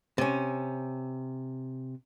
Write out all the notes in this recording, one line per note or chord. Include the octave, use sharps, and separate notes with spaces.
C3 C#4